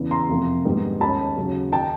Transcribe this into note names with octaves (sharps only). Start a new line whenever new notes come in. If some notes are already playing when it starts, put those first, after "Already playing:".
Already playing: E2 C#3 E3
A#5 C6
F2 C3 F3 A#3
G#2 D#3 G3 B3 D4
D#2 D#3 G#3 C#4 A5 B5
D#2 C#3 F#3
D#3 G5 A5